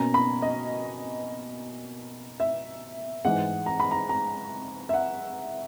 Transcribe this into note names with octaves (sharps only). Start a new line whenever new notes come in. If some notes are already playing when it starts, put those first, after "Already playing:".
Already playing: B2 A#3 C#4 A#5
B5
D#5
E5
G#2 E3 G#3 F#5
A#5
B5
A#5
A#5
E5
F#5